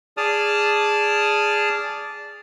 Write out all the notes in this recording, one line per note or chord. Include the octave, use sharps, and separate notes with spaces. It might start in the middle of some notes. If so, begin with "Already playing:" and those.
G#4 D5 A5 D#6 F6